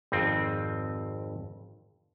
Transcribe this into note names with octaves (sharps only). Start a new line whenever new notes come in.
G#1 F2 C4